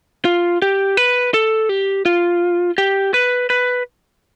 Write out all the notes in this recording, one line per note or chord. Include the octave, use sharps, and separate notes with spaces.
F4
G4
B4
A4
G4
F4
G4
B4
B4